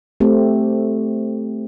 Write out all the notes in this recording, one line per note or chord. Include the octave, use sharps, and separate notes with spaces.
A3 C4 G4